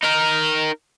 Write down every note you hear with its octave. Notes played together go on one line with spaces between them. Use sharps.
D#4 A#4